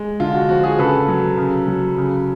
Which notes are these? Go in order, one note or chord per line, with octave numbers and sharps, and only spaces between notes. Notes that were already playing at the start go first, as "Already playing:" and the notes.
Already playing: G#3
D3 F4
F#4
F3 F#4
F#4 G#4
C#3 A4 B4
F#3
C#3
F#3
C#3